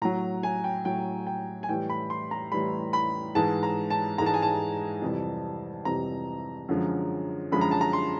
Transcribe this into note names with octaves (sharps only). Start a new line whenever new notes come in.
A2 F#3 A#5
G#5
G5
A2 F#3 G5
G5
G#5
A2 E3 G3 G5
B5
C6
A#5
A2 E3 G3 B5
B5
G#2 E3 G#3 A5
A#5
A5
G#2 E3 G#3 A#5
A5
G#5
A5
F2 C3 E3 G3
F2 C3 E3 G3 A#5
F#2 D3 F3 G#3
F#2 D3 F3 G#3 B5
A#5
A5
A#5
C6